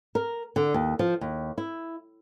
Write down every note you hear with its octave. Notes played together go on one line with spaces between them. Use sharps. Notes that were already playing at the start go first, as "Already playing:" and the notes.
A#4
D3
D#2
F3
D#2
E4